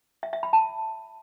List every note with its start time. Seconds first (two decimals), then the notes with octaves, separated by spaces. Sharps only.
0.23 E5
0.33 E5
0.43 B5
0.53 A5